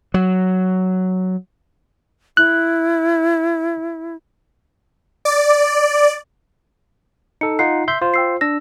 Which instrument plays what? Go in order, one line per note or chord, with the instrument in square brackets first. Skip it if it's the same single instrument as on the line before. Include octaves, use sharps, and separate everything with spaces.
[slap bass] F#3
[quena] E4 [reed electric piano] F#6
[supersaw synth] D5
[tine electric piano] D#4 A4 [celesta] C#7
[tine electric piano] D#4 F4 F#5 [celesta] C7
[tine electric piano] E5 C6 G6
[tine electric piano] F4 C5 [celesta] C6
[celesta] G5 E6 C7
[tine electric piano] D4 E6 [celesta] A#6